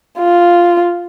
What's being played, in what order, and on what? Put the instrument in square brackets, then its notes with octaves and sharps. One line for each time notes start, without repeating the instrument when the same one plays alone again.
[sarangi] F4